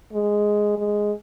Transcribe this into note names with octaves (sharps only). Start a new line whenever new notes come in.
G#3
G#3